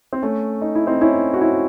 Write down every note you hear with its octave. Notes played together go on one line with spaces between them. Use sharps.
C4
A3 C#4
D#4
E4
C4 D#4
C#4 E4
F#4
C#4 E4